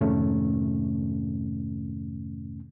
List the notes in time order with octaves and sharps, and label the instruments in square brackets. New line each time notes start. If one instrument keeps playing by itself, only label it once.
[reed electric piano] F2 G#2 C3 D#3 A3 C#4